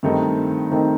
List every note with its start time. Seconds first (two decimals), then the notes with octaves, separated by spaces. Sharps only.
0.03 G2 D#3 A3 C4 D#4
0.72 D#3 A3 C4 D#4